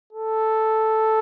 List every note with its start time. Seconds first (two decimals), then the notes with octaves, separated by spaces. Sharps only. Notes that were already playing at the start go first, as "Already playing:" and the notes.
0.13 A4